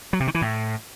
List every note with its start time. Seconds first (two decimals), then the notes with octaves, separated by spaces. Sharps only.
0.13 F#3
0.20 C3
0.27 D#3
0.35 E3
0.42 A2